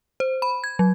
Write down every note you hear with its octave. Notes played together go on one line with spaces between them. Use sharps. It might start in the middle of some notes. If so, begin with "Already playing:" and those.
C5
B5
G#6
F#3